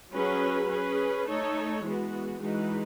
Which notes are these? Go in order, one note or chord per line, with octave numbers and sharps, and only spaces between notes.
F#3 C#4 G#4 B4
C#4 G#4 B4
A3 D#4 A4 C#5
E3 G#3 B3 F#4
E3 G#3 D#4 F#4 B4